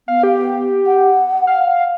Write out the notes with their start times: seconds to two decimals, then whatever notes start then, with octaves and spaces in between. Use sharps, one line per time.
0.08 B3 F5
0.23 G4
0.86 F#5
1.47 F5